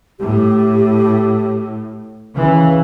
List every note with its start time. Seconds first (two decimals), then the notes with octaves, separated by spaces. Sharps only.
0.20 A2 G4
2.34 C#3 E3